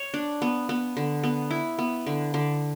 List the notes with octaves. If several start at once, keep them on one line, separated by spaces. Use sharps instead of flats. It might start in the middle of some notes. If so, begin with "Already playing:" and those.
Already playing: C#5
D4
B3
B3
D3
B3
E4
B3
D3
D3